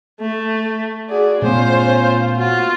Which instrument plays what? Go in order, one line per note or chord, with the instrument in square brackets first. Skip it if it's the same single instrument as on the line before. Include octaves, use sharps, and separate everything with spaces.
[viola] A3
[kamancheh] F#4 D5 [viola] G#4
[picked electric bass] A#2 A3 B3 [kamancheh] C#4 F4 [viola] C5
[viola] F4 [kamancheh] F#4 C6